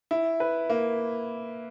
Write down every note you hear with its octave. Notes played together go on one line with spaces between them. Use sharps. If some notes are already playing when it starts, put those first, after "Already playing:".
E4
B4
A#3